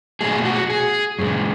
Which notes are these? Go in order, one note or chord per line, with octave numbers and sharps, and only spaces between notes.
B2 F#3 A3 G#4
F#4
G#4
F#2 C#3 G#3